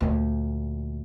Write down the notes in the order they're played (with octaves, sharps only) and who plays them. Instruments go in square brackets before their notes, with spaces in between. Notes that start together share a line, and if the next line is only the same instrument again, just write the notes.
[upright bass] D2 A#2